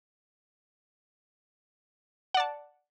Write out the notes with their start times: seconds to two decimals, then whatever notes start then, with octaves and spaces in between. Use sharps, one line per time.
2.34 F#5
2.37 D5
2.40 A5